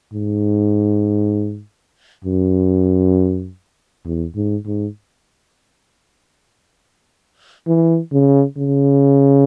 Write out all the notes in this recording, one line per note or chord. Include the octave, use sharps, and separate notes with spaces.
G#2
F#2
E2
G#2
G#2
E3
C#3
C#3